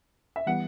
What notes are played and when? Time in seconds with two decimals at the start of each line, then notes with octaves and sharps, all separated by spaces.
0.36 E5
0.47 E3 G3 B3 F#5